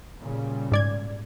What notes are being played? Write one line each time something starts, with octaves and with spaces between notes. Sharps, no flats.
A#2 C#3 G3
G#2 D5 G#6